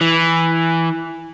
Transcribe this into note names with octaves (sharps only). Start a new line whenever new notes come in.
E3